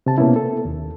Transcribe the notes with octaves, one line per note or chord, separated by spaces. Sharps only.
C3 A5
B2 A#3 B3 C#4 E4
A4
D#2